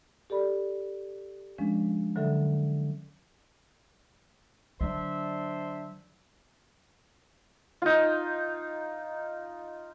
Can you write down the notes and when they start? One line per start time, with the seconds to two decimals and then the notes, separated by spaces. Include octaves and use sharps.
0.30 G4 A4 D5 B5
1.58 F3 G#3 C#4 D4
2.16 D3 F#3 A4 E5
4.81 D3 F#3 D4 C5 E5
7.82 D#4 F4